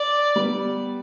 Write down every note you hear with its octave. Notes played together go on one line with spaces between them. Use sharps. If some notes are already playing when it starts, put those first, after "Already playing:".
Already playing: D5
G3 B3